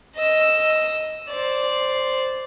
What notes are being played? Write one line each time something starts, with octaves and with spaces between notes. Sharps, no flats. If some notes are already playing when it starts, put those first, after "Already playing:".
D#5 E6
C5 D5